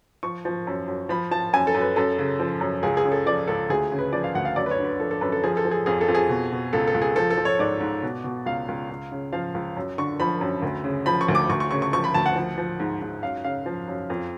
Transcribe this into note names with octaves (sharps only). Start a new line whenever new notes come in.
F3 C#6
F3
F#2
F#2
F3 B5
F3 A5
F#2 G#5
A4
F#2
B4
F#2 A4
C#3
F3
F#2
C#2 G#4
G#4
C#3
A4
F3 D5
C#2 A4
D2 G#4
C#3
B4
F3 D5
F5
D2 F#5
F5
F#2 D5
B4
C#5
D3
B4
F3 A4
A4
F#2 B4
A4
F3 G#4
A4
F3
G#4
F2 G#4
A4
F2
G#4
B2
B2
C#2 A4
A4
C#2
G#4
F3 A4
A4
F3
C#5
G#2 D5
G#2
B2
B2
C#2 F5
C#2
C#2
C#3
F3 F5
C#2
F#2
D3 C#6
F3 B5
F#2
D2
C#3
F3 B5
C#6
D2
D6
D2 C#6
C#6
C#3 C#6
C#6
F3 C#6
B5
D2 A5
F#5
F3
F3
G#2
G#2
F#2 F5
C#3 F5
F3
F#2
F2